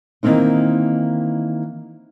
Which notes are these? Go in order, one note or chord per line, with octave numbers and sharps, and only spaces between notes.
D#3 E3 A#3 C4 D#4